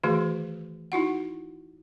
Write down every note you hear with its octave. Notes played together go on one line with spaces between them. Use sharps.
D#3 E3 A3 F#4 G#4
D#4 E4 F#4 F#5